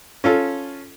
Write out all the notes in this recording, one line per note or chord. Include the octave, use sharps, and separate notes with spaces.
C#4 F4 A4